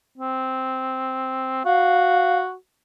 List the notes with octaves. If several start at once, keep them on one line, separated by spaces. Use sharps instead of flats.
C4
F#4 F5